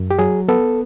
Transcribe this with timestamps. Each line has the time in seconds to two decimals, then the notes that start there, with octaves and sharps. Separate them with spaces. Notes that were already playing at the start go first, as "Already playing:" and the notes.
Already playing: F#2
0.11 G4
0.19 F#3 G#4
0.49 B3 A4